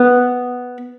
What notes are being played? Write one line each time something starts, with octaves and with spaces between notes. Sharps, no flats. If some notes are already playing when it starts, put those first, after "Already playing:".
Already playing: B3